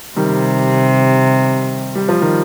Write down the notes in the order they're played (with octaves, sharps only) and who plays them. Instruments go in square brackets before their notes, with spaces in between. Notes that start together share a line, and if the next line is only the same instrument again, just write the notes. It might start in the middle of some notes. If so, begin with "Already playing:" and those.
[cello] C3 [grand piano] D#3 G3
[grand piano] G3
F3
D#3 G3